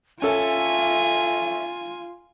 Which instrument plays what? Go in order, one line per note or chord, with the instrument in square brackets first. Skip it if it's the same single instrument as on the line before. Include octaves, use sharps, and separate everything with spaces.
[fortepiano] C#4 A4 [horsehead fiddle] F4 [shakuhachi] E5 [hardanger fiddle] G#5